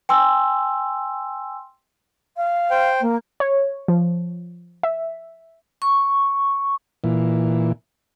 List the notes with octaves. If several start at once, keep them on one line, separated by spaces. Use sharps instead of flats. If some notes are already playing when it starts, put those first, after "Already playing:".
G5 G#5 C6 E6
F5
C5 G5
A#3
C#5
F3
E5
C#6
A#2 E3